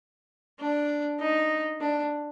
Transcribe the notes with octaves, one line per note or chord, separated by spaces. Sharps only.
D4
D#4
D4